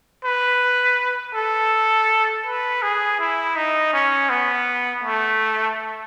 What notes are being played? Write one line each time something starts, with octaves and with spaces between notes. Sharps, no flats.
B4
A4
B4
G#4
E4
D#4
C#4
B3
A3